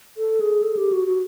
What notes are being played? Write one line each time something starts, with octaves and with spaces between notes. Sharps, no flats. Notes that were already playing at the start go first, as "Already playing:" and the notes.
A4
G#4
A4
G4
F#4
F#4